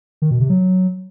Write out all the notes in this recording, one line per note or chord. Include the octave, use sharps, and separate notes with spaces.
D#3
B2
C3
F#3